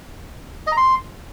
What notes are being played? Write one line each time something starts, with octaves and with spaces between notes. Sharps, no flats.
D#5
A#5
C6